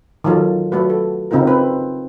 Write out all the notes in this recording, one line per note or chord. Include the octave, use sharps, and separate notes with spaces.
D#3 E3 F#3 F4 A4
F#3 A3 F#4 B4
A4
C#3 C4 D#4 F4 A#4
C4 B4